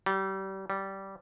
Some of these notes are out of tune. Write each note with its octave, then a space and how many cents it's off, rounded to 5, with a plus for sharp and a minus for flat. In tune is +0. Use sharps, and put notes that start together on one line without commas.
G3 -30
G3 -15